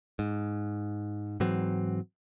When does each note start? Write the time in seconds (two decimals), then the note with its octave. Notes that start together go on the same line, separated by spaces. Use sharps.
0.19 G#2
1.40 G#2 E3 F#3 C4